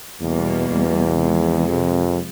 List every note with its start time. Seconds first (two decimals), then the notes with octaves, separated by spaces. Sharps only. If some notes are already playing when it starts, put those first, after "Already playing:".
0.21 E2 B2 G3 A#3
0.70 E2
1.18 C3 F3 G#3
1.68 F2